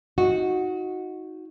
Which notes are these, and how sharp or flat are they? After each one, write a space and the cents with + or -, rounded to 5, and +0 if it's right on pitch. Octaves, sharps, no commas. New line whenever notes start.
D#4 +25 F#4 -10